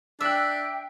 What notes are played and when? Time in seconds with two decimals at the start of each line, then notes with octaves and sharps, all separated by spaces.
0.21 D4 E5 G5 E6 F#6